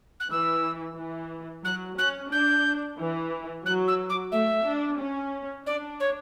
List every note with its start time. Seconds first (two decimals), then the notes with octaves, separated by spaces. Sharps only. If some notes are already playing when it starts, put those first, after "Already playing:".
0.20 F#6
0.30 E3 E6
0.97 E3
1.64 F#3 F#6
1.98 C#4 F#6
2.31 D4 G6
2.98 E3
3.65 F#3 F#6
3.87 E6
4.09 D6
4.31 A3 E5
4.65 D4
4.99 C#4
5.66 D4 D5
6.00 C#5